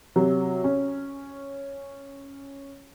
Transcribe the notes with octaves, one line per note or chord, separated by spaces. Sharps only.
C3 F#3
C#4